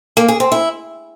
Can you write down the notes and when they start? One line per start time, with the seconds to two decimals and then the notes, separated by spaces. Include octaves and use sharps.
0.17 A#3
0.28 G#4
0.40 C4
0.52 E4